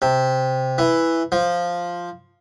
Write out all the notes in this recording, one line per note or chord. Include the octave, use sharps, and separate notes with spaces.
C3
E3
F3